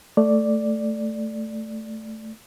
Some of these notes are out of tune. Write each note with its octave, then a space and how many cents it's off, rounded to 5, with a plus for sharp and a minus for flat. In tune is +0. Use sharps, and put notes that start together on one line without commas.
A3 +0 D5 +0